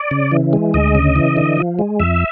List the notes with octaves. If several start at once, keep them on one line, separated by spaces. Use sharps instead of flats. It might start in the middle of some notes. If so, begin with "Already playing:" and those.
Already playing: D5
C#3
E3
G#3
D2 D#5
C#3
E3
D3
F3
G#3
F2 E5